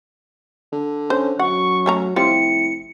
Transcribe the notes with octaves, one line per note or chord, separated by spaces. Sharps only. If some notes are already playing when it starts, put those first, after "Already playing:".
D3
C#4 C5
F#2 F#3 F#5 C#6
A3 C#4 A#5
F1 G3 C4 E4 F4 C#7